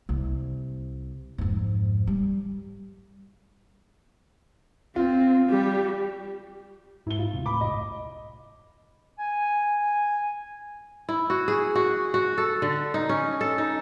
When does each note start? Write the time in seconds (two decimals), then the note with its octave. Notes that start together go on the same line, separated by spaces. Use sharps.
0.09 C2
1.38 F2 G#2
2.07 G3
4.96 C4 F4
5.49 G3 G4
7.07 G#2 E4 G7
7.18 F4
7.33 D#1 C3
7.46 A2 B5 D6
7.61 F#1 C2 G#2 D#5
9.19 G#5
11.09 E4
11.30 F#4
11.48 G#4
11.75 F#4
12.14 F#4
12.38 A4
12.62 D3
12.94 D#4
13.09 C#4
13.41 A4
13.58 D#4